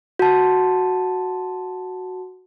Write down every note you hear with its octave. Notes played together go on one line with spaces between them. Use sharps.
F#4 A5